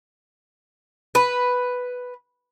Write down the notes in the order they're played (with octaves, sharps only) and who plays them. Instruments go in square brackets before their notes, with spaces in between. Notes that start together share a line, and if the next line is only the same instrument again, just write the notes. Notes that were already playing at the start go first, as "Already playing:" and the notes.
[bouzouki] B4